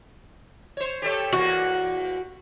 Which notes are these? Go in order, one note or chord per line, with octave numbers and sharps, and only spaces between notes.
C5 C#5
G4 A4 C#5
E2 A#3 F#4